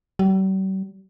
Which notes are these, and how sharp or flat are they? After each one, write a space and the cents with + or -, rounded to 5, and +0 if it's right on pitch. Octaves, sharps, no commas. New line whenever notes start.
G3 -45